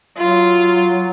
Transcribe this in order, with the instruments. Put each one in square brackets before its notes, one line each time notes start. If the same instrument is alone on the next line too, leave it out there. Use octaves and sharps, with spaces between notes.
[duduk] F#3 [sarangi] F4